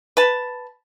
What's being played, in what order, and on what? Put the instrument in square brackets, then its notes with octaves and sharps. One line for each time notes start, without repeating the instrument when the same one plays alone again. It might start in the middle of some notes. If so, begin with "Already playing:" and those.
[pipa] B4 A5